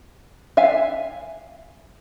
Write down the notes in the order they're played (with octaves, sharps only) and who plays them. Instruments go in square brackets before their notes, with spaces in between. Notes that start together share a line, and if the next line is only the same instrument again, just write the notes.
[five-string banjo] E5 F5 G#5